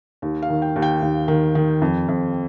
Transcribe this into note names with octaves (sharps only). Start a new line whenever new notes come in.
D#2
F5
D#3
G5
D#2
G5
D#2
D#3
D#3
F2
F2